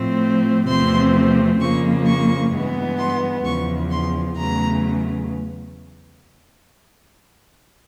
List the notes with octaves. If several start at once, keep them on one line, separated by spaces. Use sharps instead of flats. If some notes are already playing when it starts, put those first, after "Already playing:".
Already playing: A2 F3 A3 C4
E2 C3 F3 A3 C4 C6
F2 C#3 F3 A#3 C#6
C#6
G2 E3 G#3 B3
C6
E2 C#3 F3 C#6
C6
E2 C#3 F#3 A3 A#5